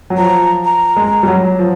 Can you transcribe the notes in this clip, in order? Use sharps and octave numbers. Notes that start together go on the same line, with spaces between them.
F#3
F3 A#5
A#5
G#3
G3
F#3
F3